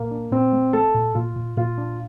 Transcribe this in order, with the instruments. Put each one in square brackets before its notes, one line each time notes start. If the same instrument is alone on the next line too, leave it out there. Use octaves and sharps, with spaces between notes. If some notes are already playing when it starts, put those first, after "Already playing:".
Already playing: [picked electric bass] A#2 [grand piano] A#3
[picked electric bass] D4
[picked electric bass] A#2 [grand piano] C4
[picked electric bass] A3
[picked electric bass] A3 [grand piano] A4
[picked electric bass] A#2
[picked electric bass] A#2 [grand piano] F4
[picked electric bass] A#2
[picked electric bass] A#2 [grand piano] F4
[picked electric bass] D4